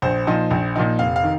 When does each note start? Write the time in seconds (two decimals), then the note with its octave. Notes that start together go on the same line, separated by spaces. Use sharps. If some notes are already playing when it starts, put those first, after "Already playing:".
0.02 A#1 C5
0.27 A#2 F3 D#4
0.51 A#1
0.75 A#2 F3 D#4
0.99 F1 F5
1.16 F5
1.24 D#3